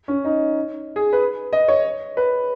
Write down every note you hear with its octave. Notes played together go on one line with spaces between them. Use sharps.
C#4
D#4
G#4
B4
D#5
C#5
B4